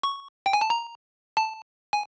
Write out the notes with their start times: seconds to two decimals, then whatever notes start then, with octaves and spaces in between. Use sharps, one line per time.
0.03 C#6
0.46 G5
0.53 G#5
0.61 A5
0.70 A#5
1.37 A5
1.93 G#5